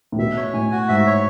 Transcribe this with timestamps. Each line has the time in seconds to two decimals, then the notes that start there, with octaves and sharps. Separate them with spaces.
0.12 A2
0.18 B2 E5
0.37 C#5
0.53 A2 G#5
0.72 F#4
0.89 G#2 E5
1.07 C#5